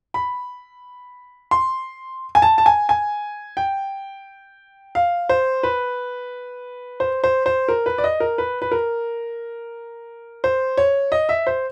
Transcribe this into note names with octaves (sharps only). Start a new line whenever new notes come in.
B5
C6
G#5
A5
A5
G#5
G#5
G5
F5
C5
B4
C5
C5
C5
A#4
B4
D5
D#5
A#4
B4
B4
A#4
C5
C#5
D#5
E5
C5